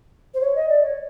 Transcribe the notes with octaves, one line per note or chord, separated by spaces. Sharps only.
C5
C#5
D#5
D5
C#5